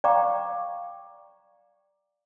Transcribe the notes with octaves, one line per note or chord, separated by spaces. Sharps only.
D5 F5 G5 A#5 C#6 D6